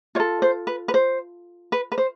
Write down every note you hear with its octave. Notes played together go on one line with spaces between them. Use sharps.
F4 A4 C#5
C5
B4
B4
C5
B4
B4
C5